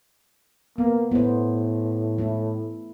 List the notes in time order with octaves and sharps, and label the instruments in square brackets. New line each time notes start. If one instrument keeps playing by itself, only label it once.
[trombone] A#3 [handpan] B3
[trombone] A2 [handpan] B3 C5
[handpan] A3 E4